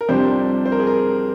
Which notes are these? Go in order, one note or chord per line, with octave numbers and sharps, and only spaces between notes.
A#4
F2 C3 G3 D4 C5
C5
A#4
G#4
A#4